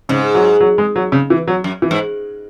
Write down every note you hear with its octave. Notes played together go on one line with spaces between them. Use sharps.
G#2 C#3
F#3
F#3
G#3
F#3
C#3
E3
F#3
F#2
E3
G#2